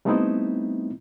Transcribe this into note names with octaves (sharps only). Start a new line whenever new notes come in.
G3 A3 B3 C4 D#4 E4